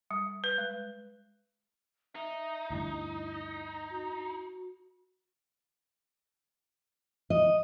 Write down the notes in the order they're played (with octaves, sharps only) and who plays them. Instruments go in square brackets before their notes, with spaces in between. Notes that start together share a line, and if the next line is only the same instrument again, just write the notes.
[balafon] G3
B4
G#3
[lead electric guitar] D#4 [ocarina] E5
[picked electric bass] D2 G2 [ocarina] E4
[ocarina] F#4
[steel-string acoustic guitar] D#5